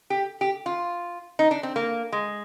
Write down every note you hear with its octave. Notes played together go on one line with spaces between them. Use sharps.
G4
G4
F4
D#4
D4
C4
A#3
G#3